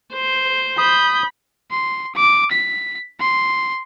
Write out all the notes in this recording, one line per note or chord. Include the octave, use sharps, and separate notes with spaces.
C5
B5 D#6 G6
C6
D6
B6
C6